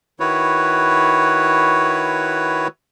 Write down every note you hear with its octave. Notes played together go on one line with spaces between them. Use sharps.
D#3 E4 F#4 B4 C#5